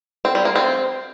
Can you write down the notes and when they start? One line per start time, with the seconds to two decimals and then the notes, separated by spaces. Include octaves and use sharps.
0.25 C4
0.35 G3
0.45 A#3
0.56 C4